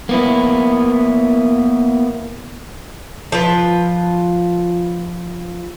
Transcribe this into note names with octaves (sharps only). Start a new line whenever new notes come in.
A#3 B3 E4
F3 F4 B4